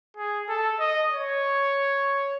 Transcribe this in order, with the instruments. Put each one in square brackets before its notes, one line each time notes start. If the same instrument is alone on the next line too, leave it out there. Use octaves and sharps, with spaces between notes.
[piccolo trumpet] G#4
A4
D#5
C#5